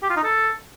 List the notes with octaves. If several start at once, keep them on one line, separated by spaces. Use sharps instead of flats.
G4
F4
D#4
A4